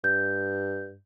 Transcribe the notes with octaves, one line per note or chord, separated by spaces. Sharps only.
G2 G6